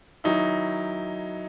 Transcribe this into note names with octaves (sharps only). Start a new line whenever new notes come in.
D#3 F#3 D#4 E4